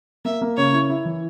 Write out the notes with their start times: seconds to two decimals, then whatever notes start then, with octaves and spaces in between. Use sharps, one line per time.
0.25 A#3 E5
0.42 A#3
0.57 C#3 C#5
0.73 E4
0.90 E4
1.05 E3